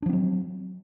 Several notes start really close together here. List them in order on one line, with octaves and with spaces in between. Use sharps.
D4 F3 C4 F#3